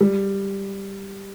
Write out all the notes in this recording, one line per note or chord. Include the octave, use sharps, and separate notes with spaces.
G3